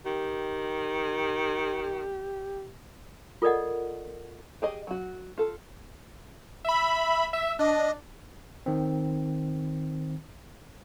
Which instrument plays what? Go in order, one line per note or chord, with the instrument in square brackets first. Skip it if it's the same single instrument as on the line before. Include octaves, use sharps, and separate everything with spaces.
[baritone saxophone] D#3 [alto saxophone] G4
[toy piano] F4 A4 A#4 D5 D#5 F#5
[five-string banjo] G4 G#4 D#5
F#3 F#4
F4 A4
[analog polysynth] E5 B5
E5
[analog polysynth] D4 [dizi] D#5
[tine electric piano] D#3 C4